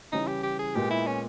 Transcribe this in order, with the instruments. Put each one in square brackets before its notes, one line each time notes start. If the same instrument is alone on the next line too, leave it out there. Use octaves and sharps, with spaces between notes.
[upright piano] C#3 E3 G3 C#4 E4 [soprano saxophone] D#4
[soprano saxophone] G4
G4
G#4
[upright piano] A#2 G#3 B3 [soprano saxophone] G4
[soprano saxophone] E4
C#4